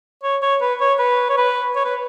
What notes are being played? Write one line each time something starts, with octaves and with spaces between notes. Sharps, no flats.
C#5
C#5
B4
C#5
B4
C#5
B4
C#5
B4